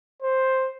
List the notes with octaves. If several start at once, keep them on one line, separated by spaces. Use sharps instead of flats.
C5